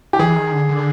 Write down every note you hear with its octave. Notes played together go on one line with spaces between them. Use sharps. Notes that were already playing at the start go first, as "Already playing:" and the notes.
G4
E3 G#4
D#3
D3
D3